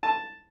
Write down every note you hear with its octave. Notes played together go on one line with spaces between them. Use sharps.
A5